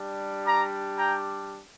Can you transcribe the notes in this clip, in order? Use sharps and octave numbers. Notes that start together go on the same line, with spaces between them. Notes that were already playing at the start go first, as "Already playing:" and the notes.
Already playing: G3 D4 G4
A#5 D6
G5 A#5